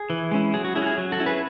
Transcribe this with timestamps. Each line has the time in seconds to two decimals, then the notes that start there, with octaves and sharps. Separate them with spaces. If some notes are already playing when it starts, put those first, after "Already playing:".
Already playing: G#4
0.10 E3
0.32 G#3 C#4 E4
0.54 F#3 G#4
0.65 F#4
0.75 C#4 E4 G#4
0.82 F#4
0.86 G#4
0.98 F#3
1.12 F#4 A4
1.20 C#4 E4
1.26 G#4 B4